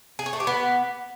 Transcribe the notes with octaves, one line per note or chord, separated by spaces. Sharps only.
G#4
C#5
A3
G4
B3